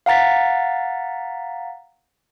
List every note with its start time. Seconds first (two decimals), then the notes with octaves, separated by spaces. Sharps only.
0.06 F5 F#5 A#5 A6 B6